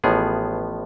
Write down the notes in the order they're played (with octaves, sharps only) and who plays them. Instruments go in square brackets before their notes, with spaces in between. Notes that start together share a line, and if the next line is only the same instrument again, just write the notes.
[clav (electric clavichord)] A1 A2 F3 B3 G#4